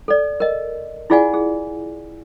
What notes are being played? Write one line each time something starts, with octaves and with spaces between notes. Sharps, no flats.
A4 D5
A#4 D#5
E4 F4 G#4 D5 F#5 G#5
G#4